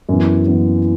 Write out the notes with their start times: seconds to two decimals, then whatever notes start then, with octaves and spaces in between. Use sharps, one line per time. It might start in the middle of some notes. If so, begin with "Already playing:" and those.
0.09 F#2 E3 B3
0.47 F#2 E3 B3